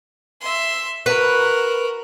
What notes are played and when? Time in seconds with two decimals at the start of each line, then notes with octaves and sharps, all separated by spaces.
0.41 E5 C6
1.06 F#4 A#4 B4